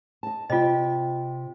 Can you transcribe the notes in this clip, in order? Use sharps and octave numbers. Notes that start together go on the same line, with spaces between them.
D#5 A5
C3 F4 D#5 G5